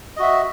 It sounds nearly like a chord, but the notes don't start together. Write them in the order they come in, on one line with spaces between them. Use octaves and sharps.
D#5 F#4 E5